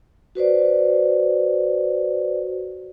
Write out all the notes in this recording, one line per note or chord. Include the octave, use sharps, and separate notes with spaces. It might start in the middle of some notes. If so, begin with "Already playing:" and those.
F#4 B4 C5 D5